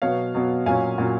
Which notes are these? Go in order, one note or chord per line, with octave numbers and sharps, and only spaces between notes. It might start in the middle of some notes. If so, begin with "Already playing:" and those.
B2 F#3 B3 C#5 F5
B2 F#3 B3
A#2 F#3 C#4 F5 G#5
A#2 F#3 C#4